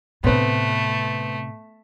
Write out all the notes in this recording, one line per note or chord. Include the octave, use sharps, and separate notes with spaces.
A2 C3 A3 B3 C4 B4